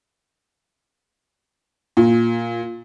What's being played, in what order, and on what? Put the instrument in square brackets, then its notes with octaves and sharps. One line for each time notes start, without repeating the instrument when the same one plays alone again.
[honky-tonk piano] A#2